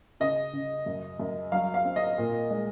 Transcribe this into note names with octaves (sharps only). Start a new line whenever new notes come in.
C#3 D#5
C#3
F#2
F#2
F#3 F5
F5
C4
D#5
A#2
G#3